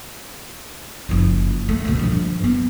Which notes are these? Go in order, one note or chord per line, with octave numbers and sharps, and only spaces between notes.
F#1 F3
A3
D2 B2
G2 F3
B3